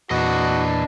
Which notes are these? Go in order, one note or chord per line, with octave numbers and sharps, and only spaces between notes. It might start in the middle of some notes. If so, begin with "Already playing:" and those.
E2 A#2 D4 F#4 B4 D#5